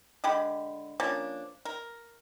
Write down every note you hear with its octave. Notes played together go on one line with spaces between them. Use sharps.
D3 G#3 G4 B5
F3 A#3 C#4 D4
A#4